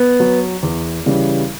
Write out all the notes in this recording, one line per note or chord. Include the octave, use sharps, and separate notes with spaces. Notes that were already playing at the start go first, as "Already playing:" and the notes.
Already playing: B3
F#3
E2
C#3 E3 G3